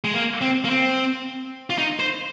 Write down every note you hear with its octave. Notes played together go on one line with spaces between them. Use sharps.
G#3
A#3
C4
A#3
C4
F4
D#4
C5